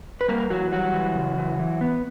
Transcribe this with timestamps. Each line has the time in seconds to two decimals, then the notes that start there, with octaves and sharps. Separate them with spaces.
0.21 B4
0.28 G3 A#3 A#4
0.50 E3 F#3 F#4
0.72 F#3 G3 F#4
0.94 E3
1.16 C#3
1.38 E3
1.59 E3
1.81 B3